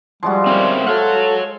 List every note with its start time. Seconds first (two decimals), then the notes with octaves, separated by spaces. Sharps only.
0.23 F3 G3 G#3 F#4
0.46 C4 C#4 A#4 E5
0.87 A4 C#5 F5 F#5